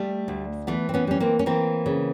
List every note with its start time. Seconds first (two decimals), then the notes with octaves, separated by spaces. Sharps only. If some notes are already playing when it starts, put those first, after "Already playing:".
Already playing: G3 A3
0.28 D2
0.67 E3 A3 B3
0.89 C4
0.94 B3 C#4
1.07 G3 C#4
1.20 A#3 C4
1.39 C#4
1.46 E3 A#3 C4
1.86 C#3